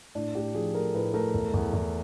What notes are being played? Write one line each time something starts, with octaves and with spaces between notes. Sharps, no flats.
A2 D4
A2 G4
F3 G#4
A3 A#4
A2 B4
A3 A#4
E2
E2
E2